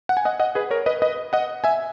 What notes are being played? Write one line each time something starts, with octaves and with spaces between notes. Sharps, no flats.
F#5
G#5
D#5 F#5
D#5 F#5
G#4 B4
A#4 C#5
B4 D#5
B4 D#5
D#5 F#5
E5 G#5